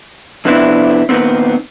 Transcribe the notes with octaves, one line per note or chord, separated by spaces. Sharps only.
F2 C3 B3 C4 D4 E4
A#2 D#3 B3 C4